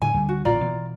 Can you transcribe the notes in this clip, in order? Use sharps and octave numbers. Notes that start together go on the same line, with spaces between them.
A2 D3 G#5
D2 D3 G3
F#4
A1 A#2 F4 D5 A#5
B2 E3